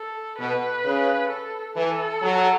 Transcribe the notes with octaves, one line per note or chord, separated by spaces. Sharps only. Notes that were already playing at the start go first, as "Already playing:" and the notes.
Already playing: A4
B2 B4
C#3
A4
E3 A4
F#3